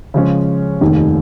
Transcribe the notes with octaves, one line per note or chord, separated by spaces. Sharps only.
C#3 F3 G#3 C#4
F1 D#2 D#3